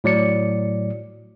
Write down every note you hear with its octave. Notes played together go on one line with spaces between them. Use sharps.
A2 F#3 D5 C#7